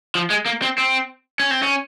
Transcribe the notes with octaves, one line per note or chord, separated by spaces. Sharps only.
F3
G#3
A#3
C4
C4
C#4
C4
C#4